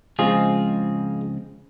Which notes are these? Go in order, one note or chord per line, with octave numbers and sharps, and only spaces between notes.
C#2 C#3 F3 G#3 C4 F4 G#4